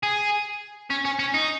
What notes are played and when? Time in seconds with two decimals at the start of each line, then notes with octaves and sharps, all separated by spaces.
0.03 G#4
0.90 C#4
1.05 C#4
1.19 C#4
1.34 D#4